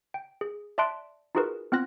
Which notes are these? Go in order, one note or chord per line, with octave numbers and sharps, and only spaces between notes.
G5
G#4
D5 E5 A5 C6 F#6 D7
D#4 F4 F#4 G#4 A#4 B4
B3 C4 F4 F#6 A#6